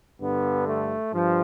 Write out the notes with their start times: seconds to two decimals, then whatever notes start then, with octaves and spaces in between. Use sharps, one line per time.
0.19 G2 D3 B3
0.66 A3
1.13 G2 F3